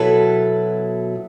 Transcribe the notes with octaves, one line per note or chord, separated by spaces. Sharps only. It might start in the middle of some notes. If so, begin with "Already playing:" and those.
Already playing: B2 F#3 B3 E4 A4